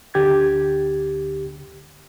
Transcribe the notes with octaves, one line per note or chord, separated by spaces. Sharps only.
D2 D3 G4 G#6 A6